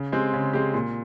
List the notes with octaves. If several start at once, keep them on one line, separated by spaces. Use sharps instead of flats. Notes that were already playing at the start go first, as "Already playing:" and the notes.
Already playing: C#3
G#3 C4 G4
C#3
G#3 C4 G4
A#2